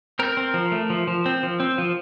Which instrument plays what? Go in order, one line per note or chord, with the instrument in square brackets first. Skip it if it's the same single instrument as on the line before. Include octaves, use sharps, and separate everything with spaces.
[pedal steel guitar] C4 A#4
C4
F3
A3
F3
F3
C4
F3
C4
F3